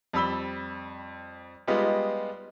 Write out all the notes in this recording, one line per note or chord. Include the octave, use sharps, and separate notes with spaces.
F2 G3 B5 E6 G7
G3 G#3 B3 D#4 F4 G4